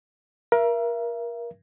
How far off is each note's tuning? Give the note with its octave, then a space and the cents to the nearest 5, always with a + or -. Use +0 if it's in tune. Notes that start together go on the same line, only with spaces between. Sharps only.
A#4 +25 E5 +40